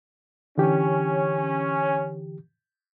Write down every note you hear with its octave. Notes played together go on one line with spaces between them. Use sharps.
D3 E3 C#4 G4